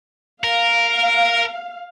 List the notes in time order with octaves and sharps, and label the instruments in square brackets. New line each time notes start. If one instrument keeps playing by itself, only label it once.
[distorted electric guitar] A#4 [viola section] F5